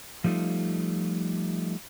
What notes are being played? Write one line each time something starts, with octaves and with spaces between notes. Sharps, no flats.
F3 G3 A3 D#4 F4